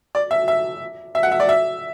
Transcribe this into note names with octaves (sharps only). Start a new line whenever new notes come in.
D5
E5
E5
E5
F#5
E5
D5
E5